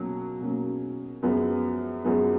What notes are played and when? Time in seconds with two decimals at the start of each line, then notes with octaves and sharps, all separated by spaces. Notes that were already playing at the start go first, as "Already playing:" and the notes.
Already playing: B2 F#3 A#3 C#4
0.41 B2 F#3 A#3 C#4
1.22 F#2 F3 G#3 B3
2.05 F#2 F3 G#3 B3